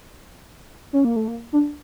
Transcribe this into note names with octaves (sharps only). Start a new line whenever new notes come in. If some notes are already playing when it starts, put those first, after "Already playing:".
C#4
A#3
A3
A#3
D4